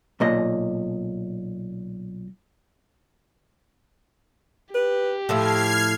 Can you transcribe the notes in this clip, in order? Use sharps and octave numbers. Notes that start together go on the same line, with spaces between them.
B1 A#2 D#5
G4 B4
A2 F3 E4 A4 F6 G#6 C7